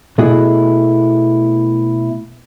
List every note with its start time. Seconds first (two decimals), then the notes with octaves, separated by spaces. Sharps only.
0.18 B2 A3 E4 F#4 G#4